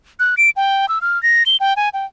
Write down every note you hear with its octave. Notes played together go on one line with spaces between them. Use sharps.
F#6
D7
G5
E6
F6
A#6
G7
G5
G#5
G5